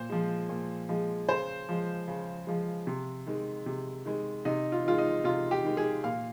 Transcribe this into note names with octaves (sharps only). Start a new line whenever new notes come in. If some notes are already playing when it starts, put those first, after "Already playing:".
Already playing: A#2 C5
F3 G#3
A#2
F3 G#3
C#3 C5
F3 G#3
C#3
F3 G#3
C3
D#3 G#3
C3
D#3 G#3
C3 D#4
F4
D#3 G#3 F4
D#4
C3 F4
G4
D#3 G#3
G#4
A#2 F5